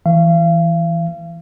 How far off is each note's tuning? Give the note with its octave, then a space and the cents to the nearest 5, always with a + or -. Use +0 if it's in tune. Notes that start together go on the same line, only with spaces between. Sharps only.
E3 +0 F5 -35